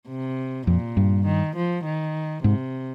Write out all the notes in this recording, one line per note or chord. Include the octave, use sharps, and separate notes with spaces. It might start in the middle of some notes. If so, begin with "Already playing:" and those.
C3
F2 A#2
G2
D#3
F3
D#3
G#2 C3